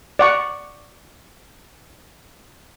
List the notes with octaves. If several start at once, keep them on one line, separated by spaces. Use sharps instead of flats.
D5 F#5 C#6